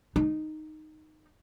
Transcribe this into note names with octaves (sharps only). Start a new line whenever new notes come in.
D#4